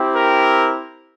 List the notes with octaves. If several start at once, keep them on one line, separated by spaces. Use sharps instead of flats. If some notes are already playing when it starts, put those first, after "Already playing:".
Already playing: C4 E4 G4
A#4